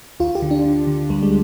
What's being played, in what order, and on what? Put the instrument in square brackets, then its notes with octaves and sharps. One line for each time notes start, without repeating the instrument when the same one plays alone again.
[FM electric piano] D2 F4
G4
D3
D4
D3
D3
D2 G3
G#3